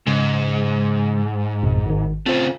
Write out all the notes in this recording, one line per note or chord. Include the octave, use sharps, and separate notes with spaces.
G#2 C#3 G#3
G#1 F2 B2
G#1 D#3
C#3 A3 C4 F4 C5